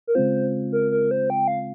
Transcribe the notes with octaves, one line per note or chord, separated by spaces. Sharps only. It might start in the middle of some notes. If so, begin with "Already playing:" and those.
A#4
C#3 G#3 C4 F4 C5
A#4
A#4
C5
G5
F5